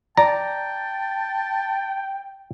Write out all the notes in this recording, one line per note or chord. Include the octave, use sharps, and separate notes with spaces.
D5 G5 A5 A#5